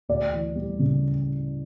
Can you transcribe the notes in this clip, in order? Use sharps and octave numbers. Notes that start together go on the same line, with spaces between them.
D2 D5
E3
G3
C#3